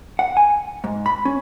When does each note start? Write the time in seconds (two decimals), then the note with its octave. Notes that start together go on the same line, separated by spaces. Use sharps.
0.19 F#5
0.37 G#5
0.84 G#2
1.06 B5
1.25 C#4